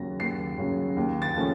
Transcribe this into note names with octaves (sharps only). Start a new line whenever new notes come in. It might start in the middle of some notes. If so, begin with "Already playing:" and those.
Already playing: D#2 C#3 F#3 A#6
D#2 C7
C#3 F#3
D#2
A6
C#3 F3 A3 C#4